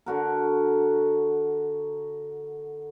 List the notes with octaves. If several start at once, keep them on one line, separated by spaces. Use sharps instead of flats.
D3 F#4 A#4